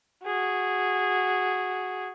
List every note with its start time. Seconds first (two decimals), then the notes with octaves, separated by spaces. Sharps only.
0.25 F#4 G#4